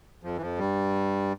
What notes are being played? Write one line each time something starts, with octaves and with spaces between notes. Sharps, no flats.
F2 F3
E3
F2 F3
G2 G3